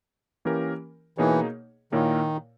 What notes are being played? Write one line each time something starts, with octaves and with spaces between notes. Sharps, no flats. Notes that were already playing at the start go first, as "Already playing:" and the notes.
E3 A#3 C#4 G4 A#4
B2 E3 A#3 D#4 G#4 C#5
A#2 D#3 A#3 E4 A#4 C#5